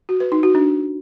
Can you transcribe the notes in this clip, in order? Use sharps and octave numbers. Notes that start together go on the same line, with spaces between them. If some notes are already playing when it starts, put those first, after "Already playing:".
F#4
B4
D#4
F#4
D4